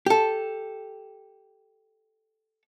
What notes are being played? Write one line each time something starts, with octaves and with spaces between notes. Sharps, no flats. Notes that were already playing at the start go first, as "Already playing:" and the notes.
G4 A4